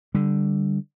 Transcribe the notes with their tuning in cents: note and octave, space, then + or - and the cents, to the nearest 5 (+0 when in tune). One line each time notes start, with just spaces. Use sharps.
D3 +0 G3 +0